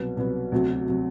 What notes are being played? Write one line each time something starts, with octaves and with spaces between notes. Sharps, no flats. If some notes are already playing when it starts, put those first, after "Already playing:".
Already playing: C2 B2 F#3 B3
C2 B2 F#3 B3
D2 C3 F#3
C3 F#3